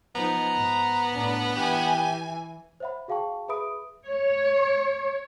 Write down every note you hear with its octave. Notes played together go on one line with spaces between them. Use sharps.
F3 B3 D#4 A#5
G#2
A2 D4
E3 G4 G#5
C5 C#5 E5 F#5 B5
F#4 G#4 F5 G5 A5 C#6
G#4 B4 E5 B5 D#6 D7
C#5